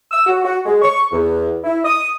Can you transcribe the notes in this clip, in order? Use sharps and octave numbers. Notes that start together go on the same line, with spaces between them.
E6
F#4
F#4
G#3
C#6
E2
E4
D#6